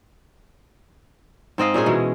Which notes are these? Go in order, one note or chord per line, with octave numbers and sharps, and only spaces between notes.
G#2 C4 D#5 F5
A#2 C#4 D#4 G#4
B2 E3 G#3